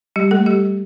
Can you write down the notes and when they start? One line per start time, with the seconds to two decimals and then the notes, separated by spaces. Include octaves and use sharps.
0.16 G3 G4
0.31 A3 A4
0.46 G3 G4